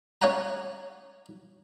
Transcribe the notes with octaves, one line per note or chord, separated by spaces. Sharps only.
C#4 C#5 F5 F#5 G#5 A#5